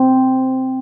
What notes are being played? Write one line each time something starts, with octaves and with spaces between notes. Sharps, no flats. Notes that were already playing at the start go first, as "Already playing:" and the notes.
Already playing: C4